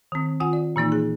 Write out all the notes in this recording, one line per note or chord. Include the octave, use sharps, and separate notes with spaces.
D#3 C4
D#3 F4 F#5 G#5
D5
A#2 E3 A#3 D#4
G#4